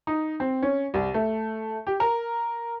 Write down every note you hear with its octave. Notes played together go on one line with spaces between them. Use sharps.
D#4
C4
C#4
C2
A3
G4
A#4